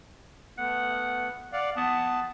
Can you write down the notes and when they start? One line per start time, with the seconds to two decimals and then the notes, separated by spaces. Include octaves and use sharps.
0.58 A3 B3 F#5
1.53 D5 F5 F#5
1.76 B3 A5